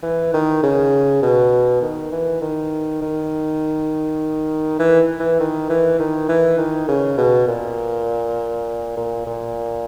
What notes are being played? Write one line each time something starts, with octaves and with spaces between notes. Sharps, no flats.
E3
D#3
C#3
B2
D#3
E3
D#3
D#3
E3
E3
D#3
E3
D#3
E3
D#3
C#3
B2
A#2
A#2
A#2